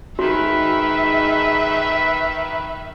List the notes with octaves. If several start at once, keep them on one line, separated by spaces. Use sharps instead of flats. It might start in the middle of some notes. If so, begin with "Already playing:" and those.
D#3 G#3 D#4 F#4 B4 E5